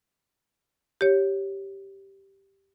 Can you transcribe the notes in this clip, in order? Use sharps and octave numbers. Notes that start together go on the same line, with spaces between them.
G4 C#5